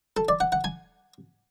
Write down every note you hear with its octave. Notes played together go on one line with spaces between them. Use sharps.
A4
D5
F#5
F#5
G#5